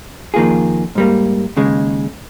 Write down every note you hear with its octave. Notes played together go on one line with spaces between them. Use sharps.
F2 D#3 A#3 F4 G#4
G#2 G3 A#3
D#2 C#3 G#3